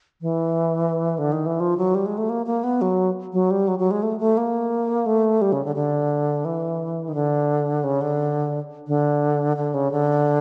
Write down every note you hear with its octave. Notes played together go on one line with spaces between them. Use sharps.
E3
D3
D#3
E3
F3
F#3
G3
G#3
A3
A#3
A#3
B3
F#3
F#3
G3
F#3
F#3
G#3
A3
A3
A#3
A3
G3
C#3
D3
D3
E3
D#3
D3
C#3
D3
D3
D3
C#3
D3